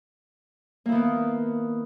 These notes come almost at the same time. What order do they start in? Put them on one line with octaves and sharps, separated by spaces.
A#3 E4 D#3 B3